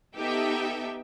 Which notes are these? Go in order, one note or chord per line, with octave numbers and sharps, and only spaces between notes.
B3 D#4 G4 A4 E5 G5